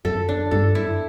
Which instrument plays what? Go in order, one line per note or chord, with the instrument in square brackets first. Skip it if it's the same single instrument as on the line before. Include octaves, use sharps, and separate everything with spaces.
[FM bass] F#2 [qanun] A4
[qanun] D4
[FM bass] G2 [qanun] A4
[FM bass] F#2 [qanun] E4